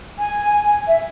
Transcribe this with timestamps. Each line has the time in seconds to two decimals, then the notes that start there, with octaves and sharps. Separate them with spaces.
0.19 G#5
0.87 E5